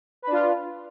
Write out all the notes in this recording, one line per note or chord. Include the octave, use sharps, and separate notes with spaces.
D4 F4 B4